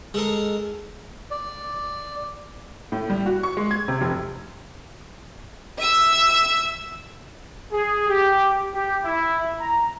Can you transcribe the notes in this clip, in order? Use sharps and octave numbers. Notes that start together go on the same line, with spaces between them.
G#3 A4 A#4
D5
A2
G3
F#4
C#6
G#3
G#6
C3
F1
E5 E6
G#4
G4
G4
E4
A#5